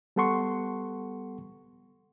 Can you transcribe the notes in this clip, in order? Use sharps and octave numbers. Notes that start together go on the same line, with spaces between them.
G3 B3 A4 F#5 C6 C#6